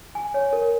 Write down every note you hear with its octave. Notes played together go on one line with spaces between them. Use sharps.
G#5
C#5
A#4